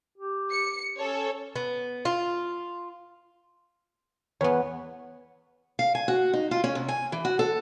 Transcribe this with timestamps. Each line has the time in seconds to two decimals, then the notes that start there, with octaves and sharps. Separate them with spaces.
0.18 G4
0.51 C#7
0.98 C#4 A4 C#5
1.56 B3
2.05 F4
4.41 E2 B3 B4 C#5
5.79 F5
5.95 G#5
6.08 F#4
6.33 D#4
6.51 F4
6.64 C#4
6.75 C3
6.88 G#5
7.12 E3
7.25 F#4
7.39 A4